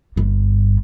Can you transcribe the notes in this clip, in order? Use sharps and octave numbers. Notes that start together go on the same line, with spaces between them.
G1 G2